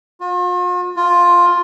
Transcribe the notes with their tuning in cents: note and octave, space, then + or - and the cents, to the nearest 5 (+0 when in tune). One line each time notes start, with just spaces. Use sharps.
F4 +45
F4 +10